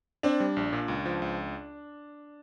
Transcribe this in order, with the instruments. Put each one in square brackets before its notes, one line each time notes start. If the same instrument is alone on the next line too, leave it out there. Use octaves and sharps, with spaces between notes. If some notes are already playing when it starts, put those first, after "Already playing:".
[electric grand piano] C4 [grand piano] D4
[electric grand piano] G3
A#1
A#2
C#2
F3
C#2